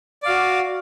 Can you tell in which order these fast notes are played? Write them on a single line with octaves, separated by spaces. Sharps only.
D5 F5 F#4